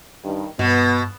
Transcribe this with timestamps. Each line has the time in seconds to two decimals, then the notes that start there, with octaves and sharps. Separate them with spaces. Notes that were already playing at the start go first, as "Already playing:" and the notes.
0.24 G2 D#3
0.59 G2 B2 B3